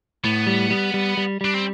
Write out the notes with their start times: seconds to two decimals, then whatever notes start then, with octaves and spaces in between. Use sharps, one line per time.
0.24 A2 B3
0.47 G3
0.70 G3
0.94 G3
1.17 G3
1.41 G3 D4
1.54 C4